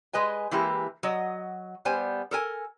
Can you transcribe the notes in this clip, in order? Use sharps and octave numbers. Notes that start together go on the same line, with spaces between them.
G#3 B4 D#5 G#5
E3 G#3 A#3 E4 G4 B4
F#3 D#5
G3 B3 C5 G#5
A4 A#4 G#5